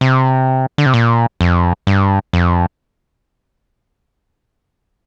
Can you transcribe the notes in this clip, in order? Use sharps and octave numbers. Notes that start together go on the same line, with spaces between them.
C3
D3
C3
A#2
F2
G2
F2